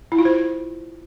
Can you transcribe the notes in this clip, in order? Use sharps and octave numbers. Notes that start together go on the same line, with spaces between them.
E4
F4
C5